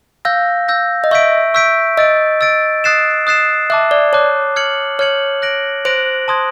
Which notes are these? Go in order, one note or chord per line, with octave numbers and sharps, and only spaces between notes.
F5 E6 G6 A#6
E6 G6 A#6
D#5
E5 C#6 E6 G6 B6 D7
C#6 E6 G6 B6 D7
D#5 E6 A6 D7
E6 A6 D7
D#6 F#6 A6 C7 E7
D#6 F#6 A6 C7 E7
E5 A5 D6 F#6
D5
C#5 A5 D6 F#6
F6 G#6 C#7 F#7
C#5 F6 G#6 C#7 F#7
F#6 A#6 D7 F#7
C5 F#6 A#6 D7 F#7
A5 C6 D#6 G#6